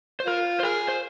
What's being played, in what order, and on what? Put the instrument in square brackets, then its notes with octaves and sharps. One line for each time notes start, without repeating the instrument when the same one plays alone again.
[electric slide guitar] C5
[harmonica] F4 [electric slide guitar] A#4
[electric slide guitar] C5
[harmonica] G#4 [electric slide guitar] A#4
[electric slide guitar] C5